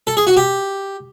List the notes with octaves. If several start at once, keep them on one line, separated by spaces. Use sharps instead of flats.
A4
G#4
F#4
G4